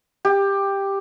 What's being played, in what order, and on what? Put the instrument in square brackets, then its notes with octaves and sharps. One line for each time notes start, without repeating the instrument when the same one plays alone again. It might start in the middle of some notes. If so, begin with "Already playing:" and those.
[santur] G4